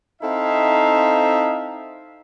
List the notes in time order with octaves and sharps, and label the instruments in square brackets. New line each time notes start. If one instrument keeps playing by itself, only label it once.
[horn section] C4 D#4 E4 A4 E5 F5